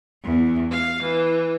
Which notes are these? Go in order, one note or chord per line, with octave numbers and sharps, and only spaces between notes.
E2
F5
E3